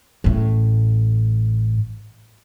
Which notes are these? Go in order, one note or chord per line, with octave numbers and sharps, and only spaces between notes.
A1 A2